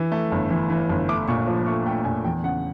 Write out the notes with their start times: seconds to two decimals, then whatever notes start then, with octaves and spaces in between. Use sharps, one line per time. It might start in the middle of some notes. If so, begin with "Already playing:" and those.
Already playing: E3
0.12 A3
0.32 G1
0.50 E3
0.70 E3
0.89 G1
1.09 A3 D6
1.28 A#2 C#6
1.47 F3
1.66 A3 C#6
1.86 A3 G5
2.05 A#2 G#5
2.24 E2 G5
2.44 C#3 F#5